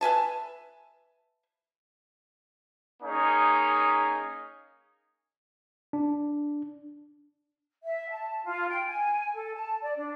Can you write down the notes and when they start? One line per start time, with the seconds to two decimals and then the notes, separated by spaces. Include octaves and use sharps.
0.01 B4 E5 G#5 A5
3.03 A#3 C#4 D#4 G#4
5.93 D4
7.84 E5
8.09 A5
8.44 F4
8.68 G5
8.87 G#5
9.33 A4
9.54 A5
9.81 D5
9.96 D4